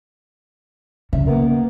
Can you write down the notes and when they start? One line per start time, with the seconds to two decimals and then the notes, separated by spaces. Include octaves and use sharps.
1.13 C#3 E5
1.27 A#3 B3 A#4